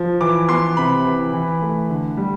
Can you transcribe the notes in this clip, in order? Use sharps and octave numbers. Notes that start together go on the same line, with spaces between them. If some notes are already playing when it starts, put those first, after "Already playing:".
Already playing: F3
E3 D6
B3 C6
C3 B5
E3
E3
A3
D3
G3